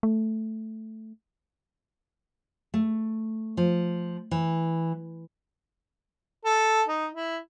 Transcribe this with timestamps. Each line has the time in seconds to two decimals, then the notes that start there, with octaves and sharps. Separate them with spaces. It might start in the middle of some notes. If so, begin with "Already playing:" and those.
0.03 A3
2.74 A3
3.57 F3
4.31 E3
6.46 A4
6.88 D#4
7.13 E4